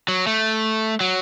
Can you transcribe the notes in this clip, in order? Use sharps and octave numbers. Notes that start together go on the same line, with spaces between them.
F#3
A3
F#3